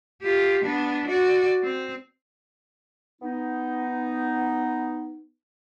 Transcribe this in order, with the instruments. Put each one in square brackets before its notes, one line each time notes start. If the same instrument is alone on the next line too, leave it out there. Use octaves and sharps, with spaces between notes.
[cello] F4 G4
B3 D4
F#4 D5
C4
[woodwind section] B3 D#4